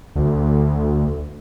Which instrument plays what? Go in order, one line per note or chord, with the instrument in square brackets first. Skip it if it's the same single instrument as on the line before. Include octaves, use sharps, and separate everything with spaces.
[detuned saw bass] D2